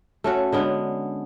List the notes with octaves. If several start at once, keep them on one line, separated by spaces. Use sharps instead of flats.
A3 C#4 F#4
D3 G#3 B3 C#4